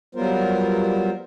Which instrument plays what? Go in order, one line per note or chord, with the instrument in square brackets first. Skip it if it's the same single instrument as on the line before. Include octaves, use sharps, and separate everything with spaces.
[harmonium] F#3 G3 B3 F4 A#4 C5